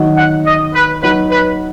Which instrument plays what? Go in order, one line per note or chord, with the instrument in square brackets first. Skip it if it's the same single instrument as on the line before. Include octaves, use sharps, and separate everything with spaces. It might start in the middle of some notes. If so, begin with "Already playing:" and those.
Already playing: [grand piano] D#3 F#3 D#4 F#4
[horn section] F#5
D#5
B4
[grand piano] F#3 D#4 F#4 [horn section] B4
[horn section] B4